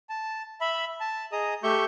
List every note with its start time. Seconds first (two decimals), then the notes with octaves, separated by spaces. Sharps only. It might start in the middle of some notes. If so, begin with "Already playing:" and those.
0.09 A5
0.61 E5 B5
1.00 A5
1.32 G#4 D#5 A#5 D#6
1.63 A3 G4 E5 C#6 G6